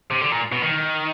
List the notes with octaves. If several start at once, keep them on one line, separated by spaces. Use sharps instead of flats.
C3
D3
A#2
B2
D#3